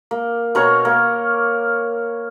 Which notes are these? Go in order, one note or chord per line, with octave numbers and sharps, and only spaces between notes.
A#3
B2 A#4 C#5 C#6
A#3